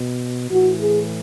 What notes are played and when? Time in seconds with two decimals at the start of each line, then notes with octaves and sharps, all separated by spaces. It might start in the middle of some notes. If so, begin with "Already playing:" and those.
Already playing: B2
0.50 A2 E3 F#4
0.79 G#4